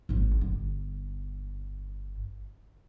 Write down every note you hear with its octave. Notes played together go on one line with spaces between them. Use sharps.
G#1 G#2
G1